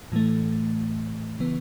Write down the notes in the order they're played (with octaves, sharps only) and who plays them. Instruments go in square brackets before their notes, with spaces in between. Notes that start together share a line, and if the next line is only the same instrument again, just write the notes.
[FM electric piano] A2 E3 A3
C#3 E3 B3